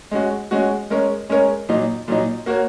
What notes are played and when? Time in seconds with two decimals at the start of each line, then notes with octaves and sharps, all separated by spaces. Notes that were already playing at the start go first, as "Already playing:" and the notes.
0.12 G#3 C#4 F#4
0.51 G#3 C#4 F#4
0.90 G#3 C#4 A#4 C#5
1.29 G#3 C#4 A#4 C#5
1.69 A#2 F#3 D#4
2.08 A#2 F#3 D#4
2.46 A#3 F#4 A#4 C#5